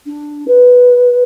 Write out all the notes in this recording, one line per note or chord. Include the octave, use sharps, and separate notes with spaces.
D4
B4